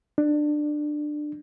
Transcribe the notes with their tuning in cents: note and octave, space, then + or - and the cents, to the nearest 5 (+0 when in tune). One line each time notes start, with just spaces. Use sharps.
D4 +20